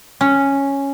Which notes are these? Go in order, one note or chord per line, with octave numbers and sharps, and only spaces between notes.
C#4